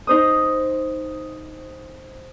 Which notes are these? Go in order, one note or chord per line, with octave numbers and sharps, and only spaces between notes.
D#4 C5 D#6